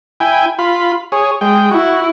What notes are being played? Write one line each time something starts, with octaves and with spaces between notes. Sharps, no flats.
E4 G5 G#5
F4 B5
G#4 C#5
G#3 G5
E4 F#4